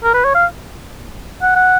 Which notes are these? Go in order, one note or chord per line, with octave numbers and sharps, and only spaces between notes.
A#4
B4
C#5
F5
F#5
F#5